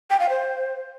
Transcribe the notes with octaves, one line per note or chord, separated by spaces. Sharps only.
G5
F5
C5